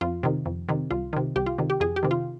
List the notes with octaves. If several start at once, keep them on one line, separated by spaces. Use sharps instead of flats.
F2 F4
C3 D#3
F2
C3 D#3
C2 F4
C3 D#3
C2 G4
F4
C3 D#3
G4
F2 G#4
G4
C3 D#3
F4